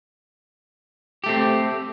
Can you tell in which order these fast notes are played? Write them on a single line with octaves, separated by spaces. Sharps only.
G4 A3 C4